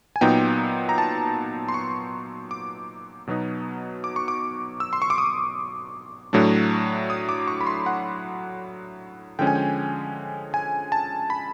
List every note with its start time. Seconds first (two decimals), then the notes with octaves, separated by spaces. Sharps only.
0.16 G#5
0.21 A#2 F#3 B3 D#4 G5
0.89 A#5
0.98 A5
1.68 C6
1.74 C#6
2.51 D6
3.27 B2 F#3 B3 D#4
4.04 D6
4.16 C#6
4.28 D6
4.80 E6
4.93 C6
5.02 C#6
5.10 D6
5.18 D#6
6.33 A2 F#3 A3 D4
7.10 D#6
7.29 D6
7.48 C#6
7.61 B5
7.67 C6
7.86 F#5
9.39 D3 F3 G#3 C#4 G5
9.47 G#5
9.55 G5
10.54 G#5
10.92 A5
11.30 B5